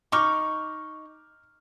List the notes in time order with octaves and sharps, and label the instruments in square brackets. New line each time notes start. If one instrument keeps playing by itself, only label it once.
[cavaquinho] D#4 C#6 [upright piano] D6 F6